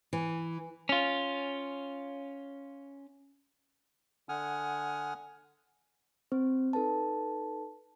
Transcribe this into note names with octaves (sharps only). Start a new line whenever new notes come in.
E3
C#4 F4
D3 F#5 G#5 D#6 F6
C4 C5
D#4 A4 B4 A5